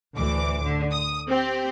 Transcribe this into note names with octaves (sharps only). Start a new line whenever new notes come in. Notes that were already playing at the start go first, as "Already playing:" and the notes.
D2 A2 E3 D6
D3
D#6
C4 G4